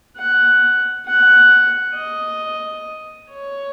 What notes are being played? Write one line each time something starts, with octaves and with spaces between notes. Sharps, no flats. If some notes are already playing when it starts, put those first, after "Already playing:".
F#5
F#5
D#5
C#5